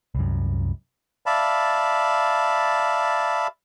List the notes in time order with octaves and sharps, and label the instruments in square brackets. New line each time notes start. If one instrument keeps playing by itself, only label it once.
[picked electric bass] C2 F#2
[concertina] D5 E5 F5 A5 B5